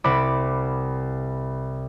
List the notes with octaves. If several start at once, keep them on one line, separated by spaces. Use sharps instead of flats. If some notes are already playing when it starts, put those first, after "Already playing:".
C2 C4 F#5 B5 D6